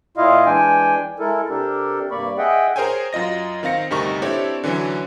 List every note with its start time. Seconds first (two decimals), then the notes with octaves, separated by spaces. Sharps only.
0.17 A#2 E4 F4 D#5 F5
0.46 E3 G#3 D4 G5 G#5
1.20 G#3 E4 A4 A#4
1.49 C3 D4 G4 A4 A#4
2.11 G2 C3 A#3 D5 B5 C#6
2.38 G#4 D#5 E5 F#5 G5
2.76 G#4 A#4 C5 C#5 G5 G#5
3.13 F#2 F4 D#5 A#6
3.63 D#3 C4 F5 A#6 C#7
3.90 D2 G2 C3 D#4 A#4 C#6
4.22 C4 D4 E4 G4 A4 C#5
4.64 D3 E3 F#3 C#4